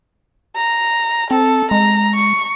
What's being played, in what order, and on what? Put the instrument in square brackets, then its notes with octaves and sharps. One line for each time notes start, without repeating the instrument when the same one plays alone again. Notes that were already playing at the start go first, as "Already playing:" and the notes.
[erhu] A#5
[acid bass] C4 [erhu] A4
[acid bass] G#3 [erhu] A#5
[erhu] C#6